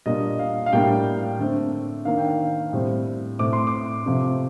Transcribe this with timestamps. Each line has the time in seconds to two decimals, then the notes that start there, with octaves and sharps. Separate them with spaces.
0.06 A#2 G3 A#3 D4 D#5
0.39 F5
0.66 F5
0.73 A2 G3 A#3 D4 G5
1.39 D3 A3 C4
2.05 D#3 A#3 D4 F5
2.18 G5
2.28 F5
2.73 A2 G3 C4
3.39 A2 A3 C4 D6
3.53 C6
3.67 D6
4.06 C3 F3 A3